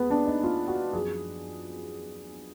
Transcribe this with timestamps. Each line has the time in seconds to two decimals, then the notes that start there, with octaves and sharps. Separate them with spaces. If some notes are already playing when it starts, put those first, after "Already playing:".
Already playing: D#2 B3 G#4
0.10 D4
0.26 D#4
0.44 F4
0.68 F#4
0.93 F#2 F3 G#4